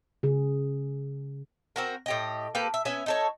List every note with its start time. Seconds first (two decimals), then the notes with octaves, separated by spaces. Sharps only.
0.23 C#3 G#4
1.76 C4 F#4 A#4
2.06 A2 G4 D#5
2.55 A#3 G4 A4 B4
2.74 E5
2.85 B3 C#4 E5 G#5
3.06 D#4 A4 C#5